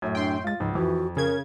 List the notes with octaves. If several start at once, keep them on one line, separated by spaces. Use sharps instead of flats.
F#2 A2
D4 G5 C6
G#3 F4 A6
C#2 G#2 F3
F2 E3 F#4
C#3 A#4 G#6